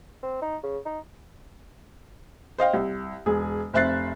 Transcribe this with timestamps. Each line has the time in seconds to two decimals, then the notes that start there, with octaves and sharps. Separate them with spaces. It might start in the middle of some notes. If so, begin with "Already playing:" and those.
0.23 C4
0.42 D#4
0.63 C#3
0.86 D#4
2.58 C5 D#5 F5 G5
2.74 C2
3.26 E1 G#4
3.73 F1 C5 E5 F#6 A6 C7